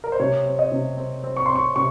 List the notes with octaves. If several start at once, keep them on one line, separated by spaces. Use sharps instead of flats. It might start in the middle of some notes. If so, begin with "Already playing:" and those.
A#4
C5
C3 C#5
C4
D#5
C3
C4
C4
C#6
C6
C4
C#6
C3 C#6